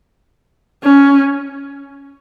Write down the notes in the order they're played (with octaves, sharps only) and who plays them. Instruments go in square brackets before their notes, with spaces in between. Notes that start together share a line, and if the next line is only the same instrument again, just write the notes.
[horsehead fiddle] C#4